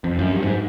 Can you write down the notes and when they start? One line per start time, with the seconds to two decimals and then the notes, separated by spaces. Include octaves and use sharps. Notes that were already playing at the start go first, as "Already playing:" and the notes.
0.04 F2
0.19 F#2
0.32 G2
0.43 G#2